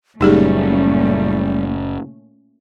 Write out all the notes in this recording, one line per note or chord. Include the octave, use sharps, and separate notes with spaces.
F#1 A#2 G3 A3 C#4 D#4 G4 G#4